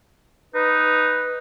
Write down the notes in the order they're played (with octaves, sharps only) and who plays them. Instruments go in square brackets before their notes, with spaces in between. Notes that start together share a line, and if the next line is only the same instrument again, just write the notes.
[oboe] D#4 [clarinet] B4